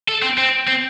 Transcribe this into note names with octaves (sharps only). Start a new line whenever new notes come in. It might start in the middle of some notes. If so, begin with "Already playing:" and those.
A4
C4
C4
C4